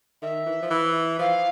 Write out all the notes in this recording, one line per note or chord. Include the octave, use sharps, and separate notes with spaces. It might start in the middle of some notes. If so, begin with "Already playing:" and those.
D#3 E5
E3
F3
E3
F3 F5